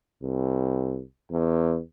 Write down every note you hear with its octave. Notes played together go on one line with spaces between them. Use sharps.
C2
E2